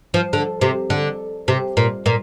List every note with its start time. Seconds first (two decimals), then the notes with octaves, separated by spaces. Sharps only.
0.14 F3
0.33 D3
0.61 C3
0.90 D3
1.48 C3
1.77 A#2
2.06 A#2